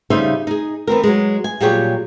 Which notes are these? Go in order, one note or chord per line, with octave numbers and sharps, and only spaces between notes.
C#3 G3 D#4 F4 C5 E5
D#4 G#4
E3 B3 C4 A#4
F#3 G#3
G#5
A#2 F#3 G3 G4 G#4 C#5